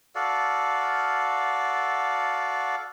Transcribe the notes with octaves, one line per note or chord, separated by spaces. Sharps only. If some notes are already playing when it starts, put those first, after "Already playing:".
F#4 A4 D5 F5